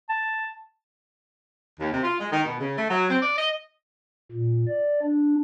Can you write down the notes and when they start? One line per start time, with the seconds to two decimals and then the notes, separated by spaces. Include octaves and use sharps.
0.09 A5
1.79 D#2
1.92 C3
2.03 F4
2.19 G#3
2.32 D#3
2.45 B2
2.59 C#3
2.77 A3
2.90 F#3
3.09 C4
3.21 D5
3.37 D#5
4.31 A#2
4.68 D5
5.02 D4